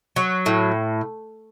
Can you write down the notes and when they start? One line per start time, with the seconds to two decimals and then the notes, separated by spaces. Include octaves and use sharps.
0.16 F#3
0.46 A2